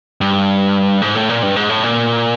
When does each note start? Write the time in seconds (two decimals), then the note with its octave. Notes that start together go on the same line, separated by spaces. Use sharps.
0.21 G2
1.02 G#2
1.15 A2
1.29 A#2
1.43 G2
1.56 G#2
1.69 A2
1.83 A#2